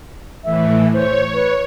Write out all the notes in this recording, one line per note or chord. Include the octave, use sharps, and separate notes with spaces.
A2 E3 E5
C5 C#5
B4